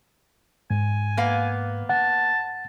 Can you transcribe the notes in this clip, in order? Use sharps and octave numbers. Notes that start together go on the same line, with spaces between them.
G#2 G#5
A#3 B3 F5
F#5 A5